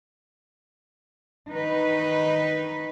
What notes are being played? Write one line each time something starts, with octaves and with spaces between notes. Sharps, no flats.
D#3 D#4 B4